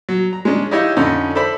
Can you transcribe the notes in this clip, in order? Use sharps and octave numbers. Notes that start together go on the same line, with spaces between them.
F#3
A#5
G#3 C#4 D4
D#4 E4 G4 C#5 D#5 F5
F2 D3 C#4 D#4
A4 C5 D5 E5 B5